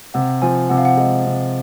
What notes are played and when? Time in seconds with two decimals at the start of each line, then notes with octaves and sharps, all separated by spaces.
0.14 C3 F#5
0.42 F3 G#5
0.69 C3 F#5
0.78 F5
0.85 F#5
0.97 G#3
1.26 C3